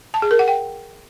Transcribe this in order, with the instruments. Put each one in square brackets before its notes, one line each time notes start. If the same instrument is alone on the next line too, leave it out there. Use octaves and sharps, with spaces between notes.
[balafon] A5
G#4
A#4
F#5
G5